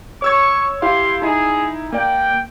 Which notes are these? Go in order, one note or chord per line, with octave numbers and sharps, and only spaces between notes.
C#5 C#6 E6 G#6
E4 G4 F5 C6
D#4 E4 G#4
A#3 D5 G5